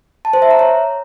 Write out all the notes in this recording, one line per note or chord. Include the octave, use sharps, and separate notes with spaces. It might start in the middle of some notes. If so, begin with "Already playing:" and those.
A5
C5
E5
A#5
C#5